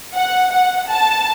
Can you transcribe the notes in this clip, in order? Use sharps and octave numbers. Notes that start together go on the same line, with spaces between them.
F#5
F#5
A5